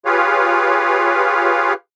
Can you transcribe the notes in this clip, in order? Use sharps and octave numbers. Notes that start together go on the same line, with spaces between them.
F4 G4 G#4 B4 C#5 F5